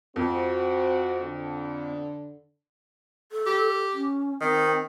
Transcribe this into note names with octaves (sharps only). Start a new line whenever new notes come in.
F2 C4 F#4
D3
A4
G4
C#4
D#3 C4